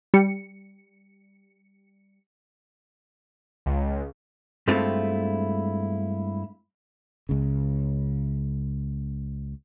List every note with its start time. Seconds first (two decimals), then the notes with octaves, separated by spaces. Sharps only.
0.14 G3 C#7
3.66 C#2
4.68 G2 G#3 A3 C4 E4 F4
7.29 C#2 C#3